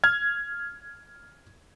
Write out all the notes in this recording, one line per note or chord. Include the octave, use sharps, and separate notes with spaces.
F6 G#6